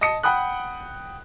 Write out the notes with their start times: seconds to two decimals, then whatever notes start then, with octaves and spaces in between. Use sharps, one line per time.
0.01 D#5 A5 D#6 C#7
0.23 F#5 G5 B5 D#6 F#6